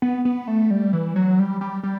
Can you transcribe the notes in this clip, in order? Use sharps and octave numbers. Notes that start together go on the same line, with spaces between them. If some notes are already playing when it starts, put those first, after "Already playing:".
B3
B3
A3
G3
E3
F#3
G3
G3
G3